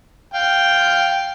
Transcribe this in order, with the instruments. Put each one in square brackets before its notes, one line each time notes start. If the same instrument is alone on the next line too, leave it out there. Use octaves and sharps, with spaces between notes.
[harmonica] F5 G5